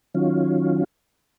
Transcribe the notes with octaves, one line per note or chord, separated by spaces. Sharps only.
D#3 F#3 C#4 F4